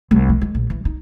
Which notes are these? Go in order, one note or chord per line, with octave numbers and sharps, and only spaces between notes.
C2
F3
G#3
A#1
E3
D#4